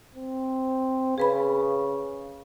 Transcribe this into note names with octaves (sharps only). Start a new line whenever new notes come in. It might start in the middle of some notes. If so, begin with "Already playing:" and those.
C4
C#3 G#4 B4 B5